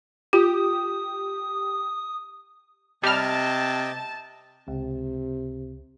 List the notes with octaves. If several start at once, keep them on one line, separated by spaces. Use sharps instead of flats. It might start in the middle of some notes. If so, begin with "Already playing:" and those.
F4 G4 D#6
C3 G3 D#5 G5 A5 F6
C#2 C3